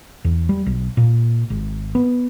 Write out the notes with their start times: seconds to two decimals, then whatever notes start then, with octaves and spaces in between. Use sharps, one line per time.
0.25 E2
0.49 G3
0.67 B1
0.97 A#2
1.50 G#1
1.95 B3